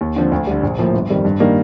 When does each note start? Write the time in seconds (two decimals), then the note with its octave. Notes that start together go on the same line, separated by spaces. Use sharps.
0.01 D#2
0.16 D3 F3 C4
0.32 D2
0.47 D3 G3
0.63 A#1
0.78 A2 F3 A#3
0.94 G1
1.10 F2 D#3 G3
1.25 G2
1.40 D#3 G3 A#3 D4